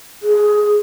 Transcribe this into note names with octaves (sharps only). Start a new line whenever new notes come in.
G#4